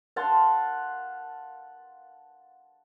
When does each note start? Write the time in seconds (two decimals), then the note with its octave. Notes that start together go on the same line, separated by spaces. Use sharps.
0.16 F5 F#5 A5 C6